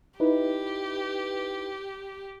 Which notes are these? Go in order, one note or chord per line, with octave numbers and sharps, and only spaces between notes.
D#4 E4 G4 B4